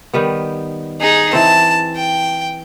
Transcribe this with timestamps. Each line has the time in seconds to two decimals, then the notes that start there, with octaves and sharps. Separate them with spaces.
0.14 D#3 G3 B3
1.01 D#4 G#4
1.33 E3 C4 A5
1.96 G5